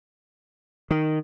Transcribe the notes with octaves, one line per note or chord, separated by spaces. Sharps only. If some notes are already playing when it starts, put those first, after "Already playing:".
D#3